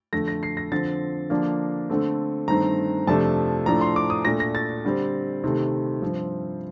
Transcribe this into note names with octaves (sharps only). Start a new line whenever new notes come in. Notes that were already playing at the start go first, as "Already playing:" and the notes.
F2 D3 A3 A#6
A#6
C7
A#6
D3 F3 C4 A6
D3 F3 A#3 D4
D3 A3 C4
G2 D#3 A3 C4 A#5
F2 C3 F3 A3 D4 A5
A2 F3 A3 D4 A#5
C6
D6
D#6
A#2 A3 D4 A#6
A#6
A6
D3 G3 C4
C3 D#3 A3 C4
G2 F3 C4